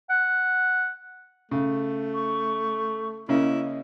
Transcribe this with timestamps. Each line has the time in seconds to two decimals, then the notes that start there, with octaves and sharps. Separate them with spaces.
0.10 F#5
1.51 C#3 A3
2.13 C#6
3.29 C#3 A#3 C#4 E4 D#5